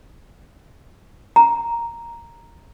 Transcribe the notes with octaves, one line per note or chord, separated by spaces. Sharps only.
A#5